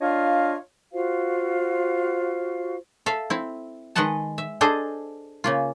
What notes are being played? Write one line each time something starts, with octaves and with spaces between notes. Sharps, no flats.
D4 F4 C#5 D#5 F5
F4 F#4 C5 F5
A4 E5 F5
C4 E4
D#3 G#3 B4 D#5 F#5 A5
E5
D4 G#4 A4 C5 D#5
C#3 A#3 F4